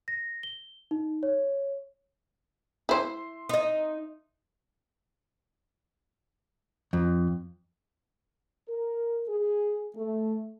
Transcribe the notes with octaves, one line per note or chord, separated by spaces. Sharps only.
A#6
G7
D#4
C#5
E4 C5 E5 C6
D#4 D#5
F2
A#4
G#4
A3